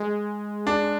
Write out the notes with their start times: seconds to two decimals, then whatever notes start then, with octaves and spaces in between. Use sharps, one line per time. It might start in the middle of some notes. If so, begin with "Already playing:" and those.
Already playing: G#3
0.67 D4